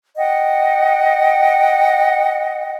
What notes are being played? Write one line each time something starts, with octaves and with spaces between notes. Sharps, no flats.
D#5 F#5 G5